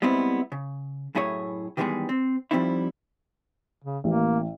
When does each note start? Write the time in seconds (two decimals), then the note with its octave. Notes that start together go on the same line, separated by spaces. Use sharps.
0.02 G3 G#3 B3 C4 E4
0.52 C#3
1.15 F#2 A2 E4 G#4 C#5
1.77 D#3 E3 G3 G#3 B3 G#4
2.09 C4
2.51 F3 G3 A3 C4 D#4 E4
3.84 C#3
4.04 A1 A#3